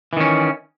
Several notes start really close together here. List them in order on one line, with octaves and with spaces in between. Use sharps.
E3 D#3 C#4